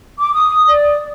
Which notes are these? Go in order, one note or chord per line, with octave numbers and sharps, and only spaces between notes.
D6
D#6
D5